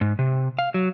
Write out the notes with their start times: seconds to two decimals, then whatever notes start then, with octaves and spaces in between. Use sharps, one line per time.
0.01 G#2
0.19 C3
0.59 F5
0.74 F#3